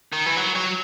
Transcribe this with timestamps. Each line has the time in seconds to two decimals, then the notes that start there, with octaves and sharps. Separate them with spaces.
0.13 D#3
0.26 E3
0.37 F#3
0.55 F#3